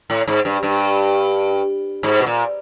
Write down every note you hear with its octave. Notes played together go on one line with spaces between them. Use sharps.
A2
G#2
G2
G2
G#2
B2
A#2